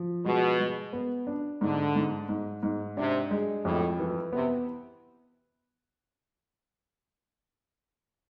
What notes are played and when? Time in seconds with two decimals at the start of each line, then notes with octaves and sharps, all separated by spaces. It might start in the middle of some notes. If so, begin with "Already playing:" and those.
Already playing: F3
0.25 B2 G#3
0.60 G#3
0.93 B3
1.27 D4
1.61 G#2 D3
1.96 G#2
2.29 G#2
2.63 G#2
2.97 C3 D4
3.31 G#3
3.64 F2 A2
3.99 E3
4.33 C3 B3